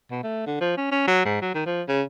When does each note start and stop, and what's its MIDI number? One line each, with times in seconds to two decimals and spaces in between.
0.11 0.21 47
0.23 0.42 57
0.47 0.60 50
0.61 0.72 53
0.77 0.87 61
0.91 1.03 61
1.08 1.23 54
1.25 1.38 44
1.42 1.53 54
1.54 1.62 51
1.66 1.82 53
1.88 2.02 49